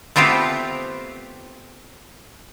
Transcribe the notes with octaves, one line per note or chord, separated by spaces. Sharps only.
A3 B3 C4 F4 G4